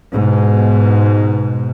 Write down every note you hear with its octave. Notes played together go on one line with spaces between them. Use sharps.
G#2 B2